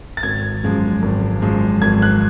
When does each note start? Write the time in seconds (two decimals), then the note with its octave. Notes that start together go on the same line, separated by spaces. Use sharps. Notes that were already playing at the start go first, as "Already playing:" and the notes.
0.17 A6
0.23 G#1 G#6
0.64 F#2 F3 G#3
1.02 G#1
1.42 F#2 F3 G#3
1.81 G#1 G#6
2.02 F#6